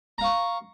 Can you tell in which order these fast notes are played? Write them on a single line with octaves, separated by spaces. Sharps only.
A#5 F5 C#6